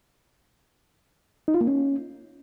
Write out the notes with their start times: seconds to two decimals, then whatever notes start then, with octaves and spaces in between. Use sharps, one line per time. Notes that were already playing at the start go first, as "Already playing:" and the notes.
1.48 D#4
1.54 F4
1.61 A#3
1.67 C#4